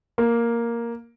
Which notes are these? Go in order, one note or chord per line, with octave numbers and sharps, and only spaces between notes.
A#3